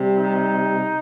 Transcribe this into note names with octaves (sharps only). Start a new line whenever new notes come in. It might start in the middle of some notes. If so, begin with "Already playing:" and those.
Already playing: C3 G3
D#4